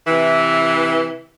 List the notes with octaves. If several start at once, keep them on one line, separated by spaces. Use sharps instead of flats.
C3 E3